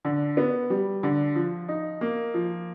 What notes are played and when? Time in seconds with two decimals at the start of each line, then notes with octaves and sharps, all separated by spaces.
0.05 D3
0.37 B3
0.70 G3
1.03 D3
1.35 F3
1.69 D#4
2.01 A#3
2.34 F3